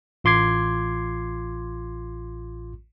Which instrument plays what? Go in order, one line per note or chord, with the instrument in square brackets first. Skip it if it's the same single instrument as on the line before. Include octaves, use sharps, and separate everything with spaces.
[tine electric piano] A1 F4 C6 D6 G#6 C7